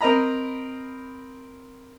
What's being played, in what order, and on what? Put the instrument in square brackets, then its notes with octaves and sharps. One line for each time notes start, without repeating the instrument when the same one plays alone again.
[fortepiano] C4 A#4 D#5 A#5 B5